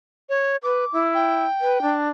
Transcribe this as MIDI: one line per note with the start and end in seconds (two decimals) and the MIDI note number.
0.29 0.57 73
0.63 0.85 71
0.63 1.01 86
0.93 1.45 64
1.15 1.95 79
1.61 1.81 71
1.82 2.09 62